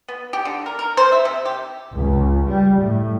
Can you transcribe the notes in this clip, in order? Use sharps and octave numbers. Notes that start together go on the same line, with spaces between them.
B3
G4
D3
A#4
A#4
C5
E5
C3
G4
C#2
G3
A2